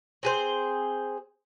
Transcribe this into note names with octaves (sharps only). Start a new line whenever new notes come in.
C4 G#4 C5